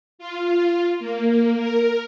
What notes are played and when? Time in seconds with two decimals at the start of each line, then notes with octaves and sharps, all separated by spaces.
0.19 F4
0.99 A#3
1.57 A#4